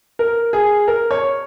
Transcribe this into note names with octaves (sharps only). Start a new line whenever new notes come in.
A#4
G#4
A#4
C#5